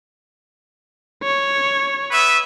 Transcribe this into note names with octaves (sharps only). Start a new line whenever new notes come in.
C#5
B3 B4 E5